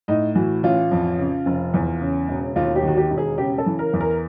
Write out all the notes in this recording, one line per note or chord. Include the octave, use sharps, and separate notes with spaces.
A2 D#4
E3 F#4
A1 F4
F2
C#3
F1
E2
C#3
E1
D#2 F4
G4
D#3 F#4
G4
E1
G#4
C#3 G4
A4
E3
A#4
E2
A#4